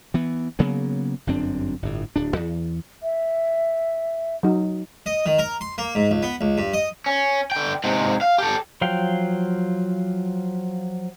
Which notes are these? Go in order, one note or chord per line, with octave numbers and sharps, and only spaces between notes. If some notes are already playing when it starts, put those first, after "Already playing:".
E3 B3
C#3 F#3 A#3 B3
G1 F#2 C4 D4
G1 A2
D1 D4
E2
E5
F#3 D#4
D#5
D#3
A#4
C6
A#3
G#2
C#2
B3
C#2
G2
D#5
C#4
D3 G5
G#2 C3
F5
G4 A4
F3 F#3 F5 G5